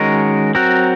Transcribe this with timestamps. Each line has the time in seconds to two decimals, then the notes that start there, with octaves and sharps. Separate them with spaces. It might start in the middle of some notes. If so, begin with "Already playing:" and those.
Already playing: D#3 G#3 C#4 F#4 A#4
0.55 F#3 C4 F#4 A#4